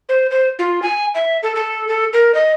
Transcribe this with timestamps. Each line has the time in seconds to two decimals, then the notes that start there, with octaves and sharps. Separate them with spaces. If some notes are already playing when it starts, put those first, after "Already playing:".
0.09 C5
0.31 C5
0.59 F4
0.82 G#5
1.15 E5
1.43 A4
1.56 A4
1.88 A4
2.13 A#4
2.34 D#5